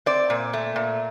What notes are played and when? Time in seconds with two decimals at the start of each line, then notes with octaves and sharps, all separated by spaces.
0.06 C4 D5
0.30 A#2
0.53 A3
0.76 A#2